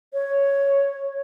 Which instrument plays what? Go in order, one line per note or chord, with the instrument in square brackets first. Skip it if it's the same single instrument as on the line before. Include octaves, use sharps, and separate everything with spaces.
[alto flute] C#5